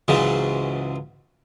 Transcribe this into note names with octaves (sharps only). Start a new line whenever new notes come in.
C#2 G#2 C#3 E3 F#3